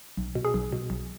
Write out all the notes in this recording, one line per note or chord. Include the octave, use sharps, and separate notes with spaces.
B1
B2
G#4
B1
B2
B1